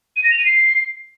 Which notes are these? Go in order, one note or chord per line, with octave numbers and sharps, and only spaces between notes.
D#7
A#6
F7
D#7
C7